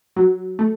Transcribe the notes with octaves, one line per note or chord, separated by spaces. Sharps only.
F#3
A3